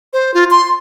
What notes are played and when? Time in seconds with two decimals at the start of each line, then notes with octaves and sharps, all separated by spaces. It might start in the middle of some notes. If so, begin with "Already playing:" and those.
0.13 C5
0.34 F4
0.51 C6